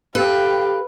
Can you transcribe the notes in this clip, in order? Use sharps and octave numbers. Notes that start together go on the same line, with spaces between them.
G4 A4 B4 F5 G5